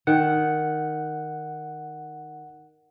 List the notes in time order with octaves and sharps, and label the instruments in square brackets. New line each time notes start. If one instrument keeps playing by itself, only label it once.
[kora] D#3 [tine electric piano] F#5